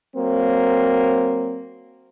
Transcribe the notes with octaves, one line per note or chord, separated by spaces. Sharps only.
F#3 A#3 C4